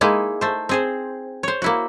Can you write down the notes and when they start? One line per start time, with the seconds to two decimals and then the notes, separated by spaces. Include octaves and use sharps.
0.01 G#3 A#3 D#4 E4
0.41 A3 C5
0.69 C4 G#4 C5
1.43 C5 C#5
1.62 A#3 E4 F#4